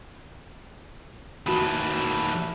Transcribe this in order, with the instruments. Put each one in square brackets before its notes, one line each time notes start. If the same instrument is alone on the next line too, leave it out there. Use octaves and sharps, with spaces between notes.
[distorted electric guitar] D#2 E3 [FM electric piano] F#4 A5 B5